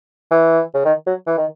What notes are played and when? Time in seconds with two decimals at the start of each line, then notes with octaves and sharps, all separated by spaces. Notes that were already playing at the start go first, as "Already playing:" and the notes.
0.31 E3
0.74 C#3
0.85 D#3
1.06 F#3
1.26 E3
1.38 D#3